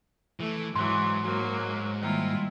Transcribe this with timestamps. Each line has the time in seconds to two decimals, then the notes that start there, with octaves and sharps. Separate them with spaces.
0.40 E3 A3
0.76 G#2 E3 F#3 C6
1.24 F#3 A#3 F#4
2.02 D#3 G3 A#3 E4 F4